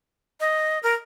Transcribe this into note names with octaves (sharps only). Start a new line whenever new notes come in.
D#5
A#4